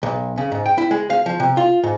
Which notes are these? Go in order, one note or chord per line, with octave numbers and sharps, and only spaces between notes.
B1
C#3
G#2
G5
E4
G#3
F5
F3
C3
F4
G#2